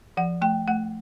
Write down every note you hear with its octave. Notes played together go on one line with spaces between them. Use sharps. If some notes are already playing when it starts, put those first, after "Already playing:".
F3 F#5
A3 G5
A3 F#5